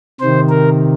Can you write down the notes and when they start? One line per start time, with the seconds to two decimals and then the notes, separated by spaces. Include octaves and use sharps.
0.20 C3 D#3 C5
0.49 A#4